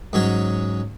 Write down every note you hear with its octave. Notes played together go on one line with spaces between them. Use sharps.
G#2 F#3 C#4 G#4